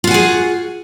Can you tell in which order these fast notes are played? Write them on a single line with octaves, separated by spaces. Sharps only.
F4 F#4 G#5 G#4